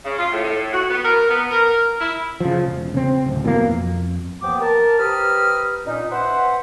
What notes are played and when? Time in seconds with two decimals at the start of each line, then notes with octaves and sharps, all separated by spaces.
0.04 C#3
0.18 F4
0.31 A2
0.43 A2
0.72 F#4
0.89 B3
1.04 A#4
1.29 B3
1.50 A#4
1.99 E4
2.40 C#3 F3
2.66 E1
2.94 C#3 C4
3.26 D1
3.44 B2 E3 F3 A#3
3.64 F2
4.41 D#2 E3 F3 B3 G5 D6
4.59 A#4 A5
4.98 G4 B4 C5 A#5 D#6 F6
5.85 A#2 C#4 D#4
6.10 B4 C5 E5 F#5